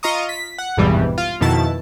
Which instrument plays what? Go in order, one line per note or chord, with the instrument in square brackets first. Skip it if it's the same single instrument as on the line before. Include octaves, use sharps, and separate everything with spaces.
[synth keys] F4 D#5 A#5 C#6 D#6
B6
F#5
G#1 E2 G2 B2 E3 G3
F4
F2 B2 D#3 E4 A5